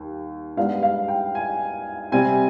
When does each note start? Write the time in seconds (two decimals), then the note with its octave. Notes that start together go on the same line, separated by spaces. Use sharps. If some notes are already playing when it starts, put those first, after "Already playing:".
Already playing: D#2 G3
0.57 G#2 G3 B3 D4 F5
0.83 F5
1.08 G5
1.35 G#5
2.12 C3 G3 C4 G#5